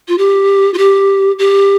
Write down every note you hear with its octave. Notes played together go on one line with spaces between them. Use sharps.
F4
G4
F4
G4
G4